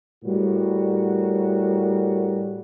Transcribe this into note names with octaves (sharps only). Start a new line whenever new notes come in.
A2 G3 F#4 A#4